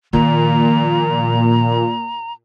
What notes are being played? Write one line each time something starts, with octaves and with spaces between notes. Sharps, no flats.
A#2 D#3 F3 A#5